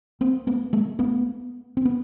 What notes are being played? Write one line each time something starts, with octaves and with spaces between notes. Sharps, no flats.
A#3 C4
A3 B3
G#3 A#3
A3 B3
C4
B3